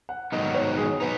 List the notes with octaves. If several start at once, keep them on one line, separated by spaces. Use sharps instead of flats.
F#5
G#2 D#3 F#3 B3 D#4 D#5
C#5
G#4
F#3 B3 D#4 B4